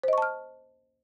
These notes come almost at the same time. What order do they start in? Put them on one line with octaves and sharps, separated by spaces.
C5 D#5 C#6 A5 F6